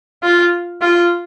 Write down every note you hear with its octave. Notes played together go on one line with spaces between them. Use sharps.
F4
F4